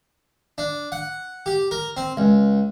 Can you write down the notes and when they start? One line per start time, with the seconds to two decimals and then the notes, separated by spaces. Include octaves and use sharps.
0.58 D4
0.92 F#5
1.46 G4
1.71 A#4
1.97 C4
2.17 C#2